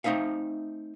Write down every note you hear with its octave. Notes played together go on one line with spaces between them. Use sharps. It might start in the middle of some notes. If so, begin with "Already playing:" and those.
A3 C4 D#4 E5 F5